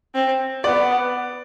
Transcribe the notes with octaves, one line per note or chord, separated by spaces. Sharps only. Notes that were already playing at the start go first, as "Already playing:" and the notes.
C4
B3 D5